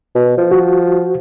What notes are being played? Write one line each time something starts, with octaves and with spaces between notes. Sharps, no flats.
B2
F3
F#4